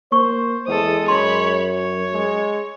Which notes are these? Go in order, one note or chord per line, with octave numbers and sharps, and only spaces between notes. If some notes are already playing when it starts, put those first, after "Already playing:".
A#3 C5 C#6
E2 G#3 A4 D#6
F#2 C#5 B5 C6
C#5
G#3